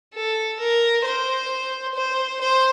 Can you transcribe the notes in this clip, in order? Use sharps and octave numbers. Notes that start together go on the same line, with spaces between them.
A4
A#4
C5
C5
C5